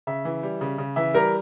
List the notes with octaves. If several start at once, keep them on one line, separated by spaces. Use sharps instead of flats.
C#3 E5
E3
G3
C#3
C#3
E3 E5
G3 A#4